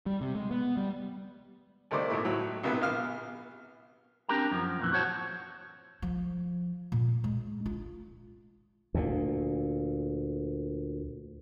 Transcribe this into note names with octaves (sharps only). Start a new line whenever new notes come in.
G3
C3
G#3
B3
G3
C2 D#3 A3 C5 D5
G#1 A#2 A3 E4
A2 F#3
A#1 C3 B3 E4 B4
A#1 B3 F5 F6
C4 D4 G4 A#4 G5 A#5
F#2 F3
F2 A#2 E3
F#4 C5 C#5 F#5 A5
F3
A#2
G#3
F4
D2 A#2